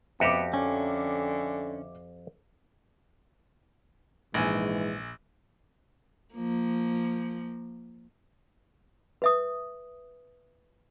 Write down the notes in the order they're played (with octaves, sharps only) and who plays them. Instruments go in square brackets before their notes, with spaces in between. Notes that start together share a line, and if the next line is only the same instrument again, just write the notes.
[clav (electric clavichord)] F2 F#4 G4 [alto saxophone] B3 [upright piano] E5 D6
[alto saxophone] D3 [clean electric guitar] C#4
[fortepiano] A#1 G#5 [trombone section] G#2 E3 G#3
[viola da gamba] F3 A#3
[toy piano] B4 E5 D#6